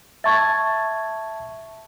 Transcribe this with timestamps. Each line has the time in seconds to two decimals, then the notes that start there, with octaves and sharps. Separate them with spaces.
0.24 E5 A5 C#6 G#6 A6